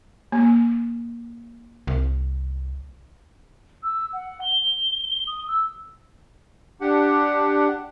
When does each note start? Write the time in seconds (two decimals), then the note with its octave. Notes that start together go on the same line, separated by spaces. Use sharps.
0.32 A#3
1.87 C2
3.82 E6
4.12 F#5
4.41 G7
5.27 D#6
5.47 E6
6.81 D4 G4 F#5